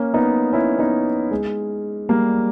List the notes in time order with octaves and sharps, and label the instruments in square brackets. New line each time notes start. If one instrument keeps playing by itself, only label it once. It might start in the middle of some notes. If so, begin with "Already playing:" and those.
Already playing: [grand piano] A#3 C#4
B3 D#4
C#4 E4
B3 D#4
G#3
G3 A#3